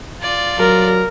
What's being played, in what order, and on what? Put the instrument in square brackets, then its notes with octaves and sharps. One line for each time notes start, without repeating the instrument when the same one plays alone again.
[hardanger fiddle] F4 D5
[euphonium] F#3 [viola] A#4